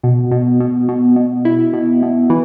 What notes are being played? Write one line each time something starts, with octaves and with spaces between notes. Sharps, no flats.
B2
B2
B2
B2
B2
E4
B2
B2
E3